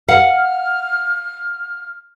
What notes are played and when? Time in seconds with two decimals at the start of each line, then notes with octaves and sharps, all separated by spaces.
0.08 F5 F#5 F6